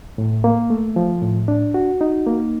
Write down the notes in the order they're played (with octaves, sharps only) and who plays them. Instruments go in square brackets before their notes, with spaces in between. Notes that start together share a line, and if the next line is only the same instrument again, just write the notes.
[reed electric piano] A2
A#3
A3
F3
A2
D4
F#4
D#4
A#3